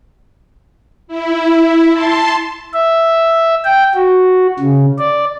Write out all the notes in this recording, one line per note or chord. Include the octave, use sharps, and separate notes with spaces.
E4
A5 C6
E5
G5
F#4
C#3
D5